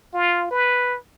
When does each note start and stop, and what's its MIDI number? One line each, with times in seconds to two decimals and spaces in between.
0.14 0.48 65
0.51 0.97 71